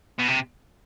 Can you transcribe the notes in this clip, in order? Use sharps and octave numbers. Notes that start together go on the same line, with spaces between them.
B2
C3